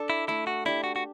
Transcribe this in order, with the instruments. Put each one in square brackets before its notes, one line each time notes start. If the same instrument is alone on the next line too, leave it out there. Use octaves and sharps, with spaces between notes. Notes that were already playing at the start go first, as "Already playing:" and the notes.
Already playing: [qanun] D4 A4
[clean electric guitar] E4
[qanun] A3 [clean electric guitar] E4
[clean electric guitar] F#4
[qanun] D4 G4 [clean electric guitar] E4
[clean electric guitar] F#4
F#4